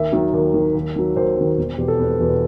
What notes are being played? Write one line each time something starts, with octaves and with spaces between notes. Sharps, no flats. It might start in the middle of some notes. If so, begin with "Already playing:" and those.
Already playing: D#2 E5
D#3 F#3
D#2
D#3 F#3
D#2
D#3 F#3
D#2 C5
D#3 F#3
E1
E2 B2 G4
A4
E1 B4
E2 B2